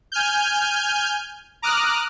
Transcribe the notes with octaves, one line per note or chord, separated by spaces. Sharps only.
G#5 F6 G6
A#5 D6 D#6 F6 F#6